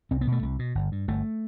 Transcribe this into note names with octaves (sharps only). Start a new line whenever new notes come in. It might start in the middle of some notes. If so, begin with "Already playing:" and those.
C2 C4
B3
B2 A3
C2
B2
G1
G2
G1 A3